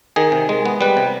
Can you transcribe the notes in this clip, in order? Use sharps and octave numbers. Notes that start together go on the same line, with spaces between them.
D#3 G#4
C3
G#3
B3
G3 B4
C3